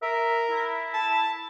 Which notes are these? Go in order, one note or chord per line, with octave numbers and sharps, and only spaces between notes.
A#4 E5
E4
A5